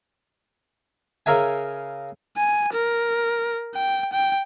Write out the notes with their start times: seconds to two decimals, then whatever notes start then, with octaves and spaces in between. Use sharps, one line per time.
1.26 C#3 A#4 E5 G#5
2.37 G#5
2.73 A#4
3.75 G5
4.13 G5